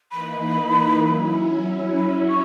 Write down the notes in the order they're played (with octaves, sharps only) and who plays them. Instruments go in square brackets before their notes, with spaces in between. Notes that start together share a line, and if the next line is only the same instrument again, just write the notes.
[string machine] E3 A#3 D#4 [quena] B5
[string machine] F#3 C#4 E4
[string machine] F#3 C#4 E4 [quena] B5
[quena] C#6